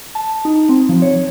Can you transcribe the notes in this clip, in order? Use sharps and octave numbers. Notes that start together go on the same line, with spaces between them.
A5
D#4
C4
F3
C#5